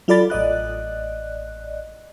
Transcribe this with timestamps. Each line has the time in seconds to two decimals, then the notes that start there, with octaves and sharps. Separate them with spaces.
0.08 F#3 F4 A4 D5 B5 A6
0.30 A1 D5 D#5 F#6